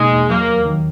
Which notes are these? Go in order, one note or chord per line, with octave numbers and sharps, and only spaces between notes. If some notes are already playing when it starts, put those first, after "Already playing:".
Already playing: B2 G#3 A#3 D#4
E2
F#3 A#3
D#2
D#3